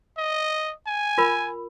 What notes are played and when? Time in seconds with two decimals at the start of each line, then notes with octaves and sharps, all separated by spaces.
0.18 D#5
0.87 G#5
1.18 F4 A#4 B5